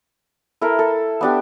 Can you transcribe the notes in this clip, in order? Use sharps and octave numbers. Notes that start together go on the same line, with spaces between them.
E4 A4 A#4
A4
B3 D4 G4